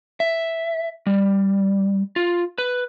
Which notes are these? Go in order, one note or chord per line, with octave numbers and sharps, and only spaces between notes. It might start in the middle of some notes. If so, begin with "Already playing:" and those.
E5
G3
F4
B4